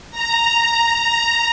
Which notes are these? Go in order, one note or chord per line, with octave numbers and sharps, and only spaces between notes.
A#5